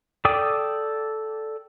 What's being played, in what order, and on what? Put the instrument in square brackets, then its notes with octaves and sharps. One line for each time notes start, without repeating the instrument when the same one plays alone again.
[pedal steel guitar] A4 D5 G5 D6 D#6